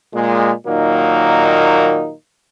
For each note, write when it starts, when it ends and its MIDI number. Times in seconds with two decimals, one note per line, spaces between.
0.14 0.51 46
0.14 0.51 56
0.66 2.13 46
0.66 2.13 51
0.66 2.13 54
0.66 2.13 58
0.66 2.13 63